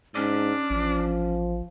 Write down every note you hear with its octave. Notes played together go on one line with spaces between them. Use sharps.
G#2 C#4 D4
A1 F3